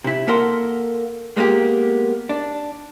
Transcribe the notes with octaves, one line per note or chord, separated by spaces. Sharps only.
C3 E4
A#3 A4 A#4 F#5 C6
G#3 A#3 B3 G4
D4